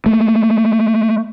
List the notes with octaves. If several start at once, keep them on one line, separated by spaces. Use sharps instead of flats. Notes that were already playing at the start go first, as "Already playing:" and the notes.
A3 A#3